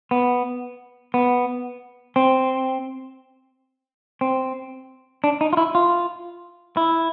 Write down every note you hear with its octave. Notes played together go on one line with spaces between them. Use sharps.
B3
B3
C4
C4
D4
D#4
F4
E4
F4
E4